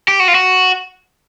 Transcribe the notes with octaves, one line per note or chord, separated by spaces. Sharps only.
G4
F#4
F4
F#4